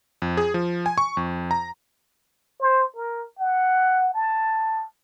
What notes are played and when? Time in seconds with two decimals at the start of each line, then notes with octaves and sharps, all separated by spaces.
0.22 F2
0.37 G#4
0.54 F3
0.86 G#5
0.98 C#6
1.17 F2
1.51 A#5
2.61 C5
2.96 A#4
3.39 F#5
4.14 A5